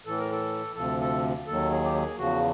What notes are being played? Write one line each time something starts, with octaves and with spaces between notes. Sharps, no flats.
A2 E3 A4
A#4
A4
D2 C3 F3 A4
A4
D#2 D#3 F#3 A4
G#4
G4
G#4
E2 C#3 F3 F#4